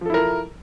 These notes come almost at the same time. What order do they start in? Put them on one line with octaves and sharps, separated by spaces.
F3 A4 E4 A#4